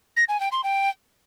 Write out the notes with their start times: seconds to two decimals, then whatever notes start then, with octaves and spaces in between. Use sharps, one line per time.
0.17 A#6
0.29 G#5
0.40 G5
0.52 C6
0.64 G5